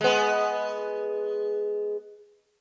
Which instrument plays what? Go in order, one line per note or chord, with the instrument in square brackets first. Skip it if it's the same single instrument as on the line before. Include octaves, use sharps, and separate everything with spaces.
[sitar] G#3 B3